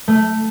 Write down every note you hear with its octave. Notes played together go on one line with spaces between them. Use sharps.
A3